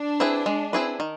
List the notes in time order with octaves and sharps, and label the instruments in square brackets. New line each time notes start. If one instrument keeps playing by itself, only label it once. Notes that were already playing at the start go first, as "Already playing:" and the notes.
Already playing: [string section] D4
[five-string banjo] C4 E4 G#4 B4
G#3
C4 E4 G#4 B4
D#3